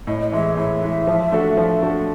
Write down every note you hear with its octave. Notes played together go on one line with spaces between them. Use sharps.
A2 D#5
D#5
E3 G#3 E5
A2 E5
E3 G#3
F3
A3 D4 F#4 A4
F3
A3 D4 F#4 A4